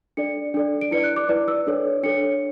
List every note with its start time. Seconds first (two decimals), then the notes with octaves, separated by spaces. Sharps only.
0.17 D4 A4 D5 C#7
0.54 D4 A4 D5
0.81 D7
0.91 E4 B4 D5 C#7
1.04 F#6
1.16 D6
1.29 E4 B4 D5
1.48 E6
1.67 D4 A4 C#5
2.03 D4 A4 C#5 C#7